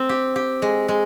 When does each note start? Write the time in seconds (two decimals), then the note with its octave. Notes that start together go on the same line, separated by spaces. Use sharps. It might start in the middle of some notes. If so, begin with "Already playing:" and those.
Already playing: C4
0.09 G4
0.36 G4
0.62 G#3
0.88 G#3